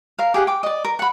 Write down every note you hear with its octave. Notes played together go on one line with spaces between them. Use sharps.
A#4 F5
G4 G#4 F5 F#5
G5 D6
D5 D#5
A#4
F#5 B5